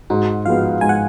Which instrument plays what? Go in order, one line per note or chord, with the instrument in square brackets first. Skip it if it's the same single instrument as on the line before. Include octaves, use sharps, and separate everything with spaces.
[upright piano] G#2 [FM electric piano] F#4
[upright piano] F3 G#3 B3 [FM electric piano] F5
[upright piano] G#2 [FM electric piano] G#5
[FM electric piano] F#5